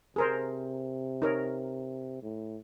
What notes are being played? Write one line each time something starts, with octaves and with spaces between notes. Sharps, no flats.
C3 G#4 A#4 C5
D#4 A#4 C#5
A2